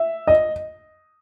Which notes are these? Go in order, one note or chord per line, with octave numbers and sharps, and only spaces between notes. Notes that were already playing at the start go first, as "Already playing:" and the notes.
Already playing: E5
D#5